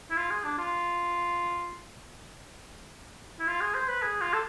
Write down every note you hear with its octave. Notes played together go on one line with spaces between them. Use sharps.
E4
F4
G#4
D4
F4
E4
F4
G#4
C5
B4
G#4
F4
A4